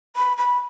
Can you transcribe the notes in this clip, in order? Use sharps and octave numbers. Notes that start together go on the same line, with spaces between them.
B5
B5